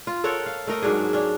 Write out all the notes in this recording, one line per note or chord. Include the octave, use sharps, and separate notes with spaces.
F4
A4 A#4 C#5 F#5
F5
A3 A#4 D#5
G#2 F#3 D4 G#4
C#4 D4